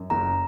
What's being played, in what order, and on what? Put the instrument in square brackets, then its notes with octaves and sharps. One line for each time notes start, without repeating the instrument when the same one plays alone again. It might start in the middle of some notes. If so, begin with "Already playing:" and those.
Already playing: [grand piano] F#2
[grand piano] F#1 [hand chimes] A#5